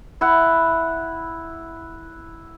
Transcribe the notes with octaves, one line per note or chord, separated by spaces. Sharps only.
E4 F#5